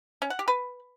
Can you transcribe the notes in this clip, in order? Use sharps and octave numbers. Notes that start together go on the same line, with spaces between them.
C#4
F#5
G4
B4